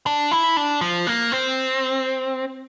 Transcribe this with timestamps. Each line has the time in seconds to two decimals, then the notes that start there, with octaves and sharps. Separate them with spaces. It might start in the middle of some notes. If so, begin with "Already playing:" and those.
0.06 D4
0.31 E4
0.57 D4
0.81 F3
1.07 A#3
1.32 C4